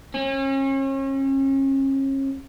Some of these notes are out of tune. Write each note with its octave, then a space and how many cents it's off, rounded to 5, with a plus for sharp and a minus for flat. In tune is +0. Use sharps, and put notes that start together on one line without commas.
C#4 -35